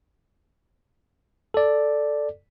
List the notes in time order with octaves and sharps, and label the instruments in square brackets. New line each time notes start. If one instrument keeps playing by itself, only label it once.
[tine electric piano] A4 D5